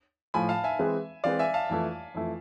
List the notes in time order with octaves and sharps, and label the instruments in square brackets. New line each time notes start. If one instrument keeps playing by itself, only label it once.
[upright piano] A2 F3 A3 [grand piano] G#5 B5
[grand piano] F5 A5
E5 G#5
[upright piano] E3 G#3 C4 G#4 B4
[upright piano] E3 G#3 C4 G#4 B4 [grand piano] D5 F5
[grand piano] E5 G#5
F5 A5
[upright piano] F2 E3 A3 E4
F2 E3 A3 E4